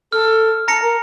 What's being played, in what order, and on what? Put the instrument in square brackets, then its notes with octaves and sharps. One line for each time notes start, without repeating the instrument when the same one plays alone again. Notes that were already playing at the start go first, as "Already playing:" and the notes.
[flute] A4 [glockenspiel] F6
[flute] A5 [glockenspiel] A#5 A#6 C#7
[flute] A#4